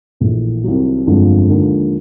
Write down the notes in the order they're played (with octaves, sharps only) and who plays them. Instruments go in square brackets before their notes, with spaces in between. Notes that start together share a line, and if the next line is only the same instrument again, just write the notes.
[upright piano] A#1 A2 E3 A3
C2 C3 D#3 F#3
G1 F2 D3 F3 G#3
D#2 D3 F3 G#3